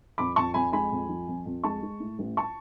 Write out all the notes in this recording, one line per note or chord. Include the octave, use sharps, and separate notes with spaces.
F2 B5 D6
F2 A5 C#6
F2 G#5 B5
G#3 G#5 B5
F2
F3
F2
F2
G#3 A5 C#6
G#3
A2
A1
A5 C#6